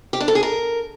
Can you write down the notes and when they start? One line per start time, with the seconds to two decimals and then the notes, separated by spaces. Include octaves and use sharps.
0.13 G4
0.20 D4
0.28 A4
0.35 G#4
0.43 A#4